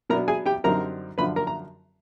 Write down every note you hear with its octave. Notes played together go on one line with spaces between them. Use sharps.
B2 F#3 B3 D4 A#4 A#5
G#4 G#5
G4 G5
F#2 D3 G3 C4 D#4 A#4 A#5
F#2 D3 F3 B4 B5
A#4 A#5
A#5